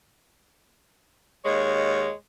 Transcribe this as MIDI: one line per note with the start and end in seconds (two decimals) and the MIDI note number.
1.45 2.11 39
1.45 2.11 56
1.45 2.11 73